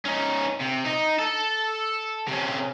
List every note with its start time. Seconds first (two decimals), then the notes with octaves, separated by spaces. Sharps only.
0.05 C#4 D#4
0.60 C3
0.85 D#4
1.19 A4
2.28 C3 C#4